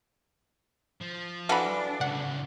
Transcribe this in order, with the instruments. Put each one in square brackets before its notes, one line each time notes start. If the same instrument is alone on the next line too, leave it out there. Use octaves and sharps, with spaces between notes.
[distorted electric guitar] F3
[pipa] E3 F#4 A4 [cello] D4 [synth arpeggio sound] F5 B5
[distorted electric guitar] C#2 A2 [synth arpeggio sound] F#5